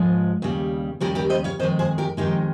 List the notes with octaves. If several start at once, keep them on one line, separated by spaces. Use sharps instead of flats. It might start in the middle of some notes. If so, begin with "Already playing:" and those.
Already playing: G#2 F3 G#3
D#2 C#3 G3
D#2 C#3 G3 G4 A#4
G4 A#4
C5 D#5
C#5 F5
F2 D#3 G#3 C5 D#5
G#4 C5
G4 A#4
F2 D#3 G#3 D#4 G4